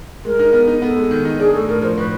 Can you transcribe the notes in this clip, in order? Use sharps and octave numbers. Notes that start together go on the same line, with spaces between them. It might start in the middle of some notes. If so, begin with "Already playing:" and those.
G#3 A#4
D#4
B3
D#4
B3 A4
G#3
D#3
D#4
D4 G#4
A2 A4
A2 A#4
F3 C5
A2 B4